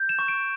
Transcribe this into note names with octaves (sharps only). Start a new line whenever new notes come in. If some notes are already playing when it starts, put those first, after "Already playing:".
Already playing: G6
E7
C#6
D7